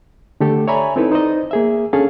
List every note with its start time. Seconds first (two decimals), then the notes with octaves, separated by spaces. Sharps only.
0.40 D3 A3 G4 A4
0.68 C#5 D5 E5 G#5 A#5 B5
0.96 C4 D#4 E4 A4 B4
1.11 D#4 C5 D5 D#5
1.51 A#3 G#4 E5
1.93 C#4 D4 G#4 A4 F5